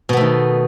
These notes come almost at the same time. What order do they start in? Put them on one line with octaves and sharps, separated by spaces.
B2 B3 A3 D#3